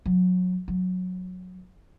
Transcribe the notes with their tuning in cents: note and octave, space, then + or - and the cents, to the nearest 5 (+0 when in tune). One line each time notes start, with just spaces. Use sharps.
F#3 -25
F#3 -15